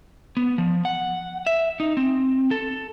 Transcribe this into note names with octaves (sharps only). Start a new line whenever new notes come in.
B3
F3
F#5
E5
D#4
C4
A4